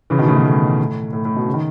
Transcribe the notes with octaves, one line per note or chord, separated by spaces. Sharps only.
C#3 E3
B2 D#3
A2 C#3
B2
A2
A2
A2
B2
C#3
D#3